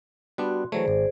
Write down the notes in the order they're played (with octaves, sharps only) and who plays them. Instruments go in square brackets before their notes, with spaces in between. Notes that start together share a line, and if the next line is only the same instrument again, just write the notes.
[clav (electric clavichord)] G3 B3 D4 [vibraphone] F#4 C6
[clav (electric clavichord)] E3 F#3 A3 [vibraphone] G#4 C5 D5
[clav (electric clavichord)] G#1